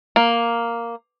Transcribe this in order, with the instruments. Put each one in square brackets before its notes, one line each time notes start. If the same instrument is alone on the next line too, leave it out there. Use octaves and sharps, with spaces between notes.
[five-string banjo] A#3